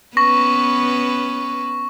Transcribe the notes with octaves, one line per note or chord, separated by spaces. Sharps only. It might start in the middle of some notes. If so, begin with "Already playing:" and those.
B3 C#4 B4 C#6 A#6